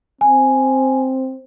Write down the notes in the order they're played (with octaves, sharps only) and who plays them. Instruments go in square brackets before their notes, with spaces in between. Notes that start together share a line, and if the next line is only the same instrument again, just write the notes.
[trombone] C4 [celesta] G#5